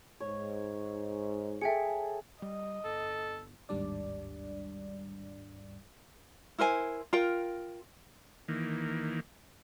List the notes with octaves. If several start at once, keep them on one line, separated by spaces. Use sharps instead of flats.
G#2 C#5
G#4 A4 E5 G5 C#7
G3 D#5
G1 A4
A1 D#2 G#2 G3 D4 D5
E4 A#4 C5 G#5
F4 A#4 G5
D#3 E3 A#3